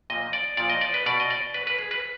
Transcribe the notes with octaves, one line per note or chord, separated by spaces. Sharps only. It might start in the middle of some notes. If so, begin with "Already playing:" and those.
A#2 F3 D#5
D5
A#2 F3 D5
D#5
D5
B4
B2 D5
D#5
D5
B2 B4
B4
G#4
B4